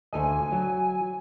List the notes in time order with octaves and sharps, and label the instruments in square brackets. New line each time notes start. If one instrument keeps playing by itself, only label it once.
[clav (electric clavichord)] D2 A4 D#5 [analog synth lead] G#5
[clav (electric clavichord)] F#3